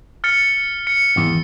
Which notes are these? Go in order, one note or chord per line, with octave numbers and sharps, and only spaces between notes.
F6 A6 C#7
C#7
G#1 E2